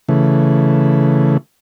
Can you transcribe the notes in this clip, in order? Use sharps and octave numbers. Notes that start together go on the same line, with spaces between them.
C#3 E3 A3